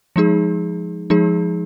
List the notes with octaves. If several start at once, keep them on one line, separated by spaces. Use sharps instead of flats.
F3 G#3 D#4 G#4
F3 G#3 D#4 G#4